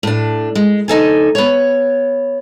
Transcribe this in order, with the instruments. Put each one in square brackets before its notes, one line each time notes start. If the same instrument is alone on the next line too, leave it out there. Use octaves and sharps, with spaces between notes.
[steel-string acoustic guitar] A2 D4
G#3
D2 D#4 A4 G#5
B3 C#5